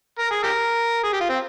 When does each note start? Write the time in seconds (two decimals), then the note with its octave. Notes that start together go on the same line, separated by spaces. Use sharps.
0.19 A#4
0.31 G#4
0.43 G4 A#4
1.03 G#4
1.13 G4
1.21 F4
1.29 C4